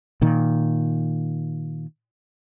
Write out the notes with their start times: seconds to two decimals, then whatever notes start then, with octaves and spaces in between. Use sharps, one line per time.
0.21 A#2 D#3